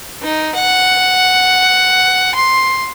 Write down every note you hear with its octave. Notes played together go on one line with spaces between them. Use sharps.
D#4
F#5
C6